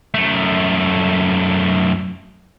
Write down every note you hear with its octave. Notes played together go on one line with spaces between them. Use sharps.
F#2 A3